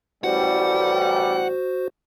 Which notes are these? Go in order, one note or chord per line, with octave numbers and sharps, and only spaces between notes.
A1 G3 F#4 C5 F#5